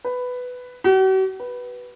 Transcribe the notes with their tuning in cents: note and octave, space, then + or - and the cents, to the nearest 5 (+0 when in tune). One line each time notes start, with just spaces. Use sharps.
B4 +10
F#4 +45
B4 -5